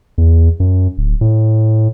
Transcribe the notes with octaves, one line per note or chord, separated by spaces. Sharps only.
E2
F#2
D1
A2